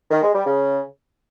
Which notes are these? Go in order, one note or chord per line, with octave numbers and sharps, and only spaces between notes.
D#3
G#3
G3
C#3